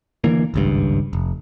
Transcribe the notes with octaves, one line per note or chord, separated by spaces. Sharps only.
D3 E3 A#3
G#1 C#2 G2
F1